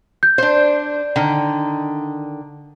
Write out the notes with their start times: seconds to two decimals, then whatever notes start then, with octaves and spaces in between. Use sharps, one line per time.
0.23 G6
0.38 D4 C5
1.16 D3 D#3